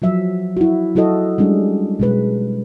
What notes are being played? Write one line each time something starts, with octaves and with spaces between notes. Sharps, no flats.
F3 F#3 E5
E4 F#4
F#3 E4 F#4 A4 D#5
G3 G#3 C#4 D4
B2 G#3 B4